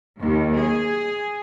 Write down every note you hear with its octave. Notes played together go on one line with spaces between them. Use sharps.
D#2
G#4